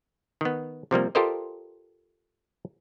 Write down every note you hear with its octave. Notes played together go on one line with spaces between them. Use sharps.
D#3 B3
C3 F3 G3 A#3
F4 G4 A4 A#4 C5 D#5